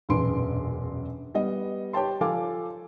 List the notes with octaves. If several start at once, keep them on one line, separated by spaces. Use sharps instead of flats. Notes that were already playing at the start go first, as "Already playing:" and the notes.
E1 A#1 F#2 B4 C6 D7
G3 B3 D#5
G4 C#5 G5 A5 C6
F3 A4 F5 G#5 D6